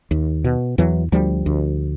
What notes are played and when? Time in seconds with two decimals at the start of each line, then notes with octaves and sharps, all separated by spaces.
0.11 D#2
0.44 B2
0.78 E2 E3 F#3
1.12 D2 F3 G3
1.46 D2